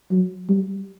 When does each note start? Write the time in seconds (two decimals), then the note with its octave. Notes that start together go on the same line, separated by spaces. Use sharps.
0.11 F#3
0.49 G3